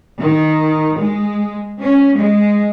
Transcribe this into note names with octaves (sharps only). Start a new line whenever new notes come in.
D#3
G#3
C#4
G#3